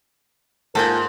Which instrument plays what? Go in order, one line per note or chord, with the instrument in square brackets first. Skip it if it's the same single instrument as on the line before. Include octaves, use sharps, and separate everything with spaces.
[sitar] G#2 [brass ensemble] A#3 F4 A#4 [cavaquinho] A4 G5 G#5